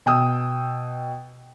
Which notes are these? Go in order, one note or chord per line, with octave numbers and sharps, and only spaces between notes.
B2 G5 D#6 E6